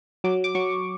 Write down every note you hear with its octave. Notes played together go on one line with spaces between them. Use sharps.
F#3 D6
D6
F#3 C#6